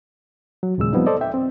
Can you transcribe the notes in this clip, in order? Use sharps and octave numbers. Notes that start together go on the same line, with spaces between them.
F#3
D#2 A#2 C#3 G#3 E6
F3 G3 B3 C4 D#4
A4 C5 D5 D#5
E5 G5
C4